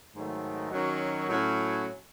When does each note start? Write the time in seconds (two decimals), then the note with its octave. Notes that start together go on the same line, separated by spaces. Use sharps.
0.14 G#2 D#3 F#3 A3
0.72 D#3 F#3 C#4 F#4
1.28 A2 F#3 C#4 F#4